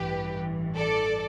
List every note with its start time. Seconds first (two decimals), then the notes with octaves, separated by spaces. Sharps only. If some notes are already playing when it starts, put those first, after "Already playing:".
Already playing: A1 G2 E3 G4 B4
0.75 A4 D5